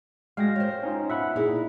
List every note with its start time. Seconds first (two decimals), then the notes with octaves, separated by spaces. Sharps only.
0.37 G#3 F#4 F5 G5 A#6
0.56 C5 C#5
0.83 C#4 D#4 F4
1.10 B2 E5 F#5 B5
1.36 A#2 D#4 E4 G#4